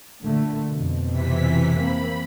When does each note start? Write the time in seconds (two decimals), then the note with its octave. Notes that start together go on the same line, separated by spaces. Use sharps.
0.21 A#2 D3 A3
0.71 F2 B2
1.08 C3 E3 B6
1.74 A#3 C4 B5